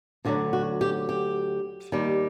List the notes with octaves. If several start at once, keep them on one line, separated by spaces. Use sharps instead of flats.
D2 D3 F#3 F#4
F#4
G4
G4
D#2 D#3 G3